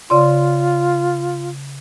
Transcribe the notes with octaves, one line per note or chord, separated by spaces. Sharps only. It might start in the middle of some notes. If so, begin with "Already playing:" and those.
C#3 F4 D5 C6